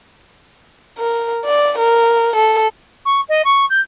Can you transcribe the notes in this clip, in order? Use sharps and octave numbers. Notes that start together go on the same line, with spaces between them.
A#4
D5
A#4
A4
C#6
D#5
C#6
G6